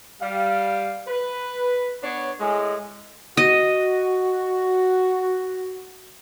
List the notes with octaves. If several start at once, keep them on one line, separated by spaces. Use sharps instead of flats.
G3 F5
B4
B3 D4 C#5
A2 G#3
F#4 D#5